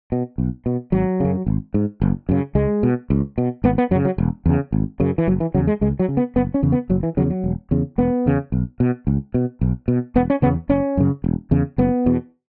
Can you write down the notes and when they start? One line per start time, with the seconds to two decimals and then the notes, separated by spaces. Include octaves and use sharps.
0.12 B2
0.38 B1
0.66 B2
0.92 G#1 F#3
1.20 F#2 C#3
1.46 G#1
1.74 G#2
2.02 F#1
2.29 F#2 C#3
2.55 C#2 G#3
2.83 B2
3.10 C#2
3.38 B2
3.64 G#1 B3
3.78 B3
3.91 F#2 F#3
3.95 C#3
4.05 F#3
4.18 E1
4.46 E2 C#3
4.72 G#1
5.00 F#2 C#3
5.18 E3
5.28 F#1 F#3
5.40 E3
5.54 C#3 F#3
5.58 E2
5.67 G#3
5.81 C#2 G#3
5.99 F#3
6.08 C#3
6.17 B3
6.36 F#1 B3
6.54 C#4
6.63 E2 C#3
6.72 B3
6.90 F#1 F#3
7.03 E3
7.17 E2 C#3 F#3
7.30 F#3
7.44 E1
7.71 E2 C#3
7.98 E1 B3
8.26 E2 C#3
8.52 B1
8.80 B2
9.07 C#2
9.34 B2
9.61 B1
9.88 B2
10.16 E1 B3
10.30 C#4
10.42 E2 C#3 B3
10.69 F#1 C#4
10.97 F#2 C#3
11.24 E1
11.51 E2 C#3
11.78 F#1 B3
12.06 E2 B2